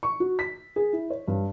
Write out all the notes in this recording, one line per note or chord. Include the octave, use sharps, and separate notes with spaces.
C#6
F#4
B6
G#4
E4
C#5
G2